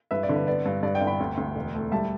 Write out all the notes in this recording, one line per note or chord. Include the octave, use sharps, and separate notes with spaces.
G2 B4 E5
D5
D3
B4
B3 D5
G2
G2 D5
D5 G5
G1
G5 B5
D2
D2
E1
A3
G3 E5 A5